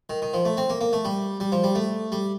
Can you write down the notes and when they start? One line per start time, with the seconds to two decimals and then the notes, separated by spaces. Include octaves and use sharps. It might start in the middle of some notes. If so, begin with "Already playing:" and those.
0.10 D#3
0.22 D#3
0.34 F3
0.45 A3
0.57 C4
0.70 A#3
0.81 A#3
0.93 A3
1.05 G3
1.40 G3
1.52 F3
1.64 G3
1.75 A3
2.12 G3